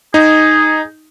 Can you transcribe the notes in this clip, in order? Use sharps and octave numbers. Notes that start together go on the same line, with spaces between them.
D#4 G#4